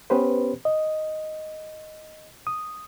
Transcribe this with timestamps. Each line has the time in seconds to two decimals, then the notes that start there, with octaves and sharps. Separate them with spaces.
0.10 B3 C#4 G4 B4 C5
0.65 D#5
2.47 D#6